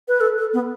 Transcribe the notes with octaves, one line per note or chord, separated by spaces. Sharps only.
B4
A4
A4
B3